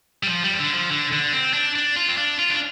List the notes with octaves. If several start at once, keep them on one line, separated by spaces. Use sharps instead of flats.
G3
F3
G3
F3
D3
F3
D3
D3
C4
D4
D4
F4
C4
D4
F4
D4